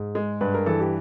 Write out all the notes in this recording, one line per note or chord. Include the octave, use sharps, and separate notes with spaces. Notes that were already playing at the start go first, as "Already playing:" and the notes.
Already playing: G#2
G#3
G2 B4
A#4
E3 A4
G4